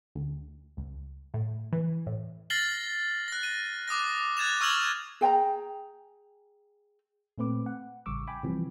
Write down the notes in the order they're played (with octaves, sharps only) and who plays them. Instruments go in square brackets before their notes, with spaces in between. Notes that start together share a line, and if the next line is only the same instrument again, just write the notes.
[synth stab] D2
C#2
A2
E3
A2
[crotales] F6 A6 A#6 C7 F#7 G7
F#6 A#6
D#7
D6 D#6 F#6 A#6
F#6 G#6 A6 E7 F7
C#6 E6 F6 G#6 F7 F#7
[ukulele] G#4 G5 G#5 A#5
[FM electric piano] A#2 A3 C4 B4 D6
F#5
A1 C#3 G3 C#6 D6 E6
G5 G#5 B5 D6
C3 E3 F3 G3